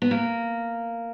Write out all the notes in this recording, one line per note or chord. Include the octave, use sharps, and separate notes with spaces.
B3
A#3